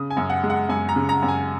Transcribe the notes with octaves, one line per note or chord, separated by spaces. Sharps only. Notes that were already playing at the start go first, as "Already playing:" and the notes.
Already playing: C#3 D#6
G#5
F#2
F#5
G#3
F#5
F#2 G#5
A#5
C#3
A#5
F#2
G#5